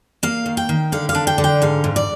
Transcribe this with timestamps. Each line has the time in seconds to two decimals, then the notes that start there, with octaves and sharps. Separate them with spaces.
0.23 A#3 F5
0.46 D#3
0.57 G5
0.69 D#3
0.92 D3 F5
1.09 F5
1.15 D4
1.27 G5
1.38 D3
1.44 G5
1.62 G#2 F5
1.84 G#2
1.96 D5